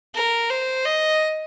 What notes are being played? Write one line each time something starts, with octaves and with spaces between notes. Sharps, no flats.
A#4
C5
D#5